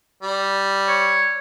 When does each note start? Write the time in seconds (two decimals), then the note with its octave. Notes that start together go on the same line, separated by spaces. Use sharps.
0.23 G3
0.88 C#5